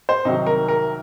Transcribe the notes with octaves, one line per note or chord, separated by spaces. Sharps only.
C5
C2 C3 D#3 F#3 D#4
A#4
A#4